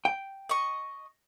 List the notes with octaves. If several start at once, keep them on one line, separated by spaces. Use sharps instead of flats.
G5
D#5 C#6